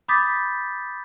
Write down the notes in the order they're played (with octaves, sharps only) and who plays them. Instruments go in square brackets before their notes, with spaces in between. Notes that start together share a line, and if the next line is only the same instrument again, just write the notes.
[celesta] B5 D6 D#6 G6 A6 B6